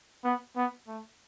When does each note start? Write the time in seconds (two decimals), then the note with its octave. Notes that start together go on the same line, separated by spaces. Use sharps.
0.24 B3
0.56 B3
0.88 A3